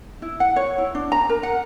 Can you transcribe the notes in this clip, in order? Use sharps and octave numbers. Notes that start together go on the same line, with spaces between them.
E4
F#5
C#5
E4
D4
A#5
A#4
F#5